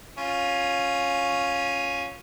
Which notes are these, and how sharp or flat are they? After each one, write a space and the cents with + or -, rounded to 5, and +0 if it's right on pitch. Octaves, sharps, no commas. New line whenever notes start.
C#4 +0 F4 +15